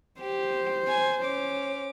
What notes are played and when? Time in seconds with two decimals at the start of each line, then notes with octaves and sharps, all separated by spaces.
0.21 G4 C5
0.88 G#5
1.21 C#4 D6